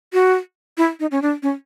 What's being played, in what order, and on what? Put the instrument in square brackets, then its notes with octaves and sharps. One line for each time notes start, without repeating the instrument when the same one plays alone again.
[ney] F#4
E4
D#4
C#4
D4
C#4